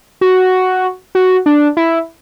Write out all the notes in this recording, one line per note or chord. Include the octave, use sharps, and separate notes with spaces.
F#4
F#4
D4
E4